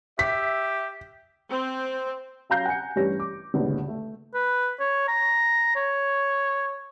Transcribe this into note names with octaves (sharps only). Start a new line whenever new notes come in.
G4 E5 B6
C4
F#3 C#4 F5 A#5 G6 C7
F#5 G#5 A#5 C#7
A1 G2 G3 C#4 C#5 A#6
D6
G#1 D2 G2 A#2 C#3
A3
B4
C#5
A#5
C#5